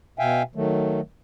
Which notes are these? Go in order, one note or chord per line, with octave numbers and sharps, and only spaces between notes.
B2 E5 F5 G5 G#5
D#3 F#3 A3